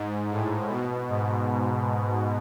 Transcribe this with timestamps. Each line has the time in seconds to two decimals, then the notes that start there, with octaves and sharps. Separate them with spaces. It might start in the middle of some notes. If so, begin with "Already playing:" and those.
Already playing: G#2
0.31 A2
0.69 B2
1.09 G#2